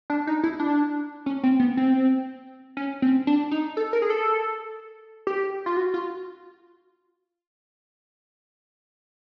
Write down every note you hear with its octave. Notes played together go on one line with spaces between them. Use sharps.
D4
D#4
E4
D4
C#4
C4
B3
C4
C#4
C4
D4
D#4
A4
A#4
G#4
A4
G4
F4
F#4
F4